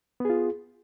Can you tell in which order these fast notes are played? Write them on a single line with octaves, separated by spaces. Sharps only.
B3 G#4 F4